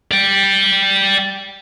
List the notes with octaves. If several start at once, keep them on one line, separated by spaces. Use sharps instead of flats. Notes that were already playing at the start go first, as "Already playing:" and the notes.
D5 G5